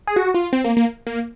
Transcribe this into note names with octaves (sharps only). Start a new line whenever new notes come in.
G#4
F#4
F4
C4
A#3
A#3
A#3